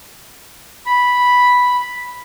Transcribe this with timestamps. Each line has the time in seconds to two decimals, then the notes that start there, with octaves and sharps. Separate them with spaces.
0.86 B5